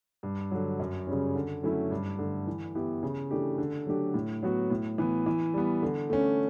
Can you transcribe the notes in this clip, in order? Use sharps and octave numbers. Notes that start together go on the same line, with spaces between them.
G2
D3 F#3
F#2
C#3 G3 C#4
D3
F#3 A3 C#4 E4
G2
D3 A3
E3
B3 E4 G4
C#3
E3 A3 D4 G4
D3
F#3 A3 D4 G4
A2
F#3 B3 F#4
A2
E3 B3
E3
G3 B3
D3
A3 C#4